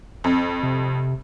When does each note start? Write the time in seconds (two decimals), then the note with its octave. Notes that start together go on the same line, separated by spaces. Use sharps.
0.24 F2
0.63 C3